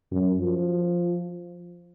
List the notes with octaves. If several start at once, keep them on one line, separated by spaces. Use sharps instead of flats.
F#2
F3